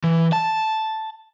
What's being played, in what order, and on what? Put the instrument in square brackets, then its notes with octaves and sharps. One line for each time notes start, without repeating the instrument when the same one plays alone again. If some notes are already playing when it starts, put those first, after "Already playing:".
[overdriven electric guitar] E3
A5